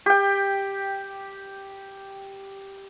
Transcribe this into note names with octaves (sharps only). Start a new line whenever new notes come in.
G4 G5